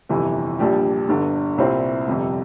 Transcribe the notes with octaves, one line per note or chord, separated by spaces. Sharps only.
G1 F2 C3 E3
A#1 A#2 G3 D4 G4
G1 G2 D3
C2 A#2 G3 C4 E4
G1 F2 C3 G3